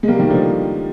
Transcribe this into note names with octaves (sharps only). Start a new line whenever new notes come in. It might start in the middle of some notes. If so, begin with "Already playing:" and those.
G#3
G3 A#3
D#3 G3
D3 F3